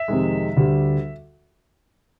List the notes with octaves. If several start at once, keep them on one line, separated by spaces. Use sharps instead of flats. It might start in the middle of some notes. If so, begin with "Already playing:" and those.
Already playing: E5
F2 C3 D#3 G#3
D2 D3 G3